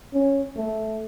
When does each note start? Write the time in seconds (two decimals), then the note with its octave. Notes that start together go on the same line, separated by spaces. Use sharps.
0.14 C#4
0.56 A3